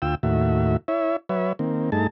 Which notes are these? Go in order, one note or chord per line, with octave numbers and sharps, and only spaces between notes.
D2 F4 G5 E6
D#2 A2 F#4 E5
E4 C#5 E5
F#3 B4 C#5 E5
D#3 A#3 C4
G2 A3 D#4 G#4 A5